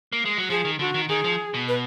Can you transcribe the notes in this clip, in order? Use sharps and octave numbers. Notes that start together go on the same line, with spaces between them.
A#3
G#3
F#3
F3 G#4
D#3
D3 F#4
D#3
D#3 G#4
F3
B2
B4